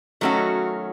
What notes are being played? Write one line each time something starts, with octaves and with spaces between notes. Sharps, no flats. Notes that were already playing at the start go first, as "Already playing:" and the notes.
D#3 F#3 A3 C#4 F#4